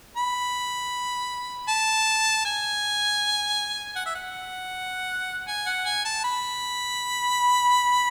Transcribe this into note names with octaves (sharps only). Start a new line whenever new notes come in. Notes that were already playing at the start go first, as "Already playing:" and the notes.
B5
A5
G#5
F#5
E5
F#5
G#5
F#5
G#5
A5
B5